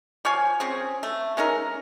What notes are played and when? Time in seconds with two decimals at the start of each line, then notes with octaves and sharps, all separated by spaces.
0.25 F3 C#5 F5 G#5
0.60 C4 C#4 G#4
1.03 A3
1.37 G#3 C#4 D#4 A#4